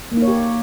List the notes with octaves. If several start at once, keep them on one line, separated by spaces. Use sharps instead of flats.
A#3
D#4
C#5
G4